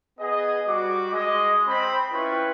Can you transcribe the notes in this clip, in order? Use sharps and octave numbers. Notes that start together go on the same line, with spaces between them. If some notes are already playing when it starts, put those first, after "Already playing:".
B3 G#4 D#5
G3 F#4 D6
G#3 D#5
C4 B5
C#4 E4 F4 B4 G5 C#6